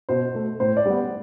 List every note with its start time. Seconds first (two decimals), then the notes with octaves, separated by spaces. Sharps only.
0.09 B2 C5
0.35 A3
0.60 A2 C5
0.77 D5
0.86 G3 B3